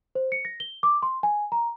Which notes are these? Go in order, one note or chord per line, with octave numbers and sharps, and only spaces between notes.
C5
C#7
A#6
G7
D6
C6
G#5
A#5